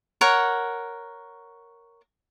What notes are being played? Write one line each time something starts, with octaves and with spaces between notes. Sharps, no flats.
A#4 C#5 F#5